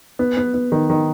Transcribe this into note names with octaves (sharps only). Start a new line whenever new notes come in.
B3
B3
B3
D#3
D#3